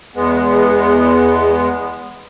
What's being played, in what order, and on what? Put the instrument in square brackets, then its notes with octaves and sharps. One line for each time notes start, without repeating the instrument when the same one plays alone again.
[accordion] E2 G#3 B3